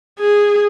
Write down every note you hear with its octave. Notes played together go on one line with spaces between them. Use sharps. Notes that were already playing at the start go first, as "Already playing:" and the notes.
G#4